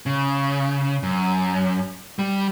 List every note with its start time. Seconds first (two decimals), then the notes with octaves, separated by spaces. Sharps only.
0.06 C#3
1.03 F#2
2.19 G3